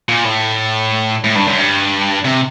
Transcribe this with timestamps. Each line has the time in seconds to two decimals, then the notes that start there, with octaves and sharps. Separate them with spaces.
0.09 A#2
0.25 A2
1.24 A2
1.36 G2
1.47 F#2
1.58 G2
2.25 C3